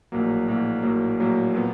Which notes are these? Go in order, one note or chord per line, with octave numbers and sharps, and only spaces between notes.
A#1 A2 F#3 A#3
A#1 A2 F#3 A#3
A#1 A2 F#3 A#3
A#1 A2 F#3 A#3
A#2 F#3 B3